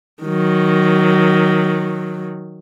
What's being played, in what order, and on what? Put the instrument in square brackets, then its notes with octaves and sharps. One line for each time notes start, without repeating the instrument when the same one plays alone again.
[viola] D#3 F#3